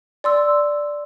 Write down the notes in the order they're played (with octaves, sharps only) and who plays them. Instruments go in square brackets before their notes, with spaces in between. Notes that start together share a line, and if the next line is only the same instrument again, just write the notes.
[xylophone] D5 C6 E6